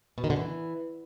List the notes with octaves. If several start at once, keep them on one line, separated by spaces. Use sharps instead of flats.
B2
D#3
D3
E3